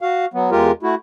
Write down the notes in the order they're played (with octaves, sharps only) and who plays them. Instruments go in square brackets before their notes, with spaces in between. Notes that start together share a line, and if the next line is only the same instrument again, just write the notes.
[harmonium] F#4 F5
F#3 B3
E2 G#3 F4 G4 A#4
A3 E4 F#4